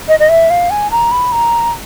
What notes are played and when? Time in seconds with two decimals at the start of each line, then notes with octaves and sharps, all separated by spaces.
0.08 D#5
0.20 D#5
0.29 E5
0.50 F5
0.70 G#5
0.91 A#5
1.11 B5
1.32 A#5